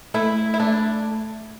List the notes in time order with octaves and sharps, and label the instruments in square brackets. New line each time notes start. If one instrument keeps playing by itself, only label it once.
[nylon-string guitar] A3 [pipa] E4
[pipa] E4
[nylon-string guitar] A3 [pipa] D4